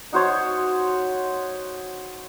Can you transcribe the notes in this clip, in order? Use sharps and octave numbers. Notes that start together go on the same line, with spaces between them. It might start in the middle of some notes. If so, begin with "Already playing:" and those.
D#4 F#4 C5 C#5